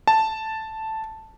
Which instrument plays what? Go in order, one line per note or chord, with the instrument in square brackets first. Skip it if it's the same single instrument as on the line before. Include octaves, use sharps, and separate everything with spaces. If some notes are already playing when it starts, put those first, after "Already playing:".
[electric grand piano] A5